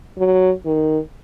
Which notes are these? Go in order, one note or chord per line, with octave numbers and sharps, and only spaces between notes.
F#3
D#3